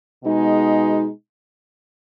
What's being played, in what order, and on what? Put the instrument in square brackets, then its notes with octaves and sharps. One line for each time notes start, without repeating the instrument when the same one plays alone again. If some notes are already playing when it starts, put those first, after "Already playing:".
[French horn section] B2 G#3 D#4